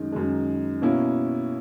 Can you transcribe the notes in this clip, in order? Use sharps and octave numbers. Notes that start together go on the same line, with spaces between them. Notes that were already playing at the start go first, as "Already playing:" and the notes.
Already playing: F#2 D#3 G#3
F#2 D#3 G#3
B2 A#3 C#4 E4